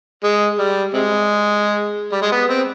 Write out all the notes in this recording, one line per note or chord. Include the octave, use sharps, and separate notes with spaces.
G#3
G3
C3 G#3
G3
G#3
B3
C4